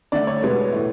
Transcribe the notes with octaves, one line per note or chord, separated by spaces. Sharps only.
D3 A3 D5
C#5
B2 G#3 B3
A2 E3 A3